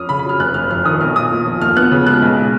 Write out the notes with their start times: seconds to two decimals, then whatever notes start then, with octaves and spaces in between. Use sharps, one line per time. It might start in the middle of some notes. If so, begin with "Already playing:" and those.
Already playing: F2 C#4 D#6 F6
0.09 C#3 B5
0.19 B5
0.25 F#3 F6
0.39 F1 F#6
0.54 F1 F6
0.70 F2 F6
0.85 D#3 D#6
1.01 B1 F6
1.16 B1 D#6
1.31 A#2
1.46 F3
1.61 D#2 F6
1.77 B3 F#6
1.91 C#3
2.07 G#3 F#6
2.22 B1